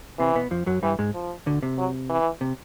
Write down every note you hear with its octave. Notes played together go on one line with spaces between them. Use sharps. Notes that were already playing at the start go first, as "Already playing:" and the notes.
C3 E3 C4
B2 B3
F2 F3
F#2 F#3
G2 E3 G3
G#2 G#3
F3
D2 D3
C3
F#3
E3
C3